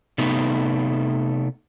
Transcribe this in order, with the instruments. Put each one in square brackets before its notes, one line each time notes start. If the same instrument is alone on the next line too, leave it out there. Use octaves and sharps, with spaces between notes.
[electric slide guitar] C3 A3 B3 D#4